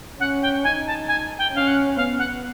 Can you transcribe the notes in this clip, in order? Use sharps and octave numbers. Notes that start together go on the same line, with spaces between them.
C#4 F#5
G5
D#4 G#5
A5
G#5
G5
C#4 F5
F#5
B3 F5
F#5